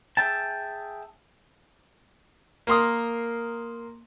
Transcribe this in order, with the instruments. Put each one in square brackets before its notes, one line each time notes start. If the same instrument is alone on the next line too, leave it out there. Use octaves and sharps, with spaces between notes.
[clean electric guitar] G#4 E5 G5 A5
[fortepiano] A#3 A#4 C6 D#6